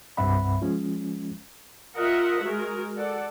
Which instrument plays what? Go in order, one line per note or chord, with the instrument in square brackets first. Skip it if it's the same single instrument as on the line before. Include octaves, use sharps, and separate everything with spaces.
[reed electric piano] C2 G2 C4 E5 F#5 B5
F3 G#3 C#4
[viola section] F4 A#4 D#5 E5 F#5
G#3 F#4 A#4
A4 D5 F#5